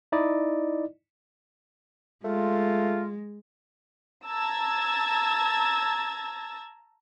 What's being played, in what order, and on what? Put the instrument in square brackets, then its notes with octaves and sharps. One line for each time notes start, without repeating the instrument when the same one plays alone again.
[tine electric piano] D#4 E4 D5 D#5
[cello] G#3 [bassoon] A3 [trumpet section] F4
[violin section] A5 A#5 E6 G#6 A6